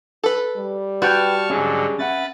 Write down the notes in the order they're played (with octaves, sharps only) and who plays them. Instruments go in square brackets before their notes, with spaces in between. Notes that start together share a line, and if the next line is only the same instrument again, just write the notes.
[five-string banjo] A4 B4
[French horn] G3
[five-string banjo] F#4 [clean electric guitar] B4 G5 [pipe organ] A5 C#6 F6
[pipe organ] G#2 D3 F#3 [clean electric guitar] C#4 G#4
[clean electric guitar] C#4 E5 F#5 [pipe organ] B4 A6